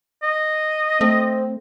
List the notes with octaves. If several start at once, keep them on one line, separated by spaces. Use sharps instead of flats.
D#5
A3 C4